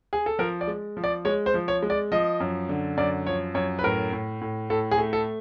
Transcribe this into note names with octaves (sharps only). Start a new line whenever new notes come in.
G#4
A4
F3 A#4
D5
G#3
F3
D5
G#3 C#5
C5
F3
C#5
G#3
D5
F3 D#5
F#2
D3
F#2 D5
F3 C#5
F#2 C#5
B4
A2 A#4
A2
A2
A2 A4
G#4
A3
A4